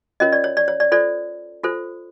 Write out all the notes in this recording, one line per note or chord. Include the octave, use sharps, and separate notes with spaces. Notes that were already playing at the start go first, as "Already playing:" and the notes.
C#4 F4 A#4 C#5 D#5
D5
C#5
D5
C#5
D5
F4 A4 C5 D5
F4 A4 C5